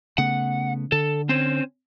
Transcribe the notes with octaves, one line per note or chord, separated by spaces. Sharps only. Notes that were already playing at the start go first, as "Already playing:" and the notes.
C#3 A3 B3 F#5
D3 A4
C4 C#4 C5